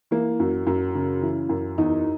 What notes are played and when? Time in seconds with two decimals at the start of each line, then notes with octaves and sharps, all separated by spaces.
0.11 E3 A#3
0.40 F#2
0.67 F#2
0.95 C#3
1.22 E3
1.49 F#2
1.78 E2 D#4